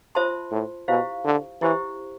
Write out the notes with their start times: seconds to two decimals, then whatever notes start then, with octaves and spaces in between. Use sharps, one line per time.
0.15 F4 C5 E5 A5 C6
0.52 A2
0.88 B2 E4 G4 C5 F5
1.25 D3
1.61 E3 E4 G4 C5 E5